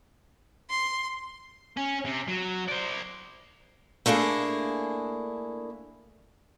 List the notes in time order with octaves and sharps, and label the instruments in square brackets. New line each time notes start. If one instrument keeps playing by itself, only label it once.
[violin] C6
[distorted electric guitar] C#4
C3
F#3
C5 D5
[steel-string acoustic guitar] A3 A#3 D4 E4 G#4